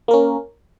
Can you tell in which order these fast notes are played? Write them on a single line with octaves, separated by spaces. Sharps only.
A#3 A#4 C#4